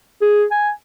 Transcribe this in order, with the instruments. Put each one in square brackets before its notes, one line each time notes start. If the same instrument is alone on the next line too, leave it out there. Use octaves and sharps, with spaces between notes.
[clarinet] G#4
G#5